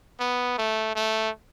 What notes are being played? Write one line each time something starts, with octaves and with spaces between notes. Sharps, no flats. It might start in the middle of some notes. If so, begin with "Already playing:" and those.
B3
A3
A3